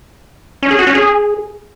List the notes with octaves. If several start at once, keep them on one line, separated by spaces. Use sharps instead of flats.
C#4
G#4
F#4
C#4
G#4